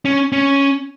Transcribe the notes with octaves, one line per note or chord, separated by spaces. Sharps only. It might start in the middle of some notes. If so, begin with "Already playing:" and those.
C#4
C#4